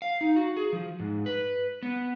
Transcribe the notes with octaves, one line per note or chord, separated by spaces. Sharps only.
F5
D#4
F#4
G#4
F3
G#2
B4
B3